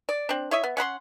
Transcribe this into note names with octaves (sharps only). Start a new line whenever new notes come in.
D5
C4 D4
E4 C#5 D#5 E5
B3
C#4 F#5 B5 C6